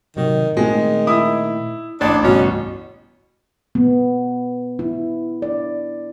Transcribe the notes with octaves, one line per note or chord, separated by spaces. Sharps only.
A2 C3 D#3 F#3
A#2 D#3 G#3 A3 C4
E4 D#6
A1 D4 D5
C#2 G2 B2 C#4
B3
E4
D5